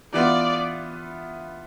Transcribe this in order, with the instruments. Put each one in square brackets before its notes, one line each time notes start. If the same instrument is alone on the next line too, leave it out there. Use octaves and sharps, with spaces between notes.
[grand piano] E3 B3 F4 [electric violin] D5